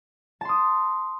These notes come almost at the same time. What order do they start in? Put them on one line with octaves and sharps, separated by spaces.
A5 C6 D#6